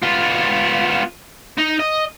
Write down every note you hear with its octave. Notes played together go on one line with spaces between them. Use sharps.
B3 F4
D#4
D#5